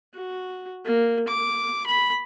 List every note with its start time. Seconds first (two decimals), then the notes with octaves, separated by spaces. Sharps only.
0.14 F#4
0.85 A#3
1.28 D6
1.86 B5